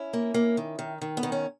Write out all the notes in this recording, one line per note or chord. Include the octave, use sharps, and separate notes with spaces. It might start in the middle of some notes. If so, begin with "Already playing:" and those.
Already playing: C#4 E4
A#3
A#3
D#3
D#3
D#3
B3
D#3
C#4